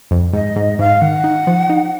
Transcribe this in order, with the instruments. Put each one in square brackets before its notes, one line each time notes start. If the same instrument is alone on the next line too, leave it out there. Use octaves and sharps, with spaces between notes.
[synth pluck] F2
[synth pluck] G#2 [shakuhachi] D#5
[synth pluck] G#2
[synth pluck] G#2 [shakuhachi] F5
[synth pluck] D#3 [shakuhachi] F#5
[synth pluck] D#4
F3
D#4